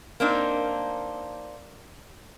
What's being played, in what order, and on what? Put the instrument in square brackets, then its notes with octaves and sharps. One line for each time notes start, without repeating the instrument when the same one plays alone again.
[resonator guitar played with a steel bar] A#3 C4 D4 D#4